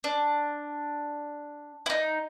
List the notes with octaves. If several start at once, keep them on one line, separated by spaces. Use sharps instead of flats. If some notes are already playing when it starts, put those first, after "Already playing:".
D4
E4
D#4